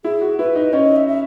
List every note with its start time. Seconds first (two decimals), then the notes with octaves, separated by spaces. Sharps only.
0.04 E4 G#4
0.21 F#4
0.38 E4 B4
0.55 D#4
0.72 C#4 D#5
0.96 E5
1.07 E5